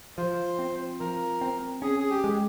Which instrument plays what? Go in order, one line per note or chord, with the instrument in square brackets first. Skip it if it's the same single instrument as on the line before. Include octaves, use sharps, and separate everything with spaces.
[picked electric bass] F3 [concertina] C5
[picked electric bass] C4
[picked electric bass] F3 [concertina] A#4
[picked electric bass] C4
[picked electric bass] C#4 [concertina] G#4
[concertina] G#4
G4
[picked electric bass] G#3